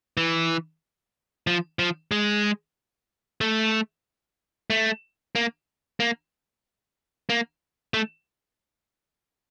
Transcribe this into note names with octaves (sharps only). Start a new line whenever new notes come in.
E3
F3
F3
G#3
A3
A3
A#3
A#3
A#3
A3